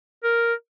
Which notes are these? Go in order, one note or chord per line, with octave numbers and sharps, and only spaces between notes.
A#4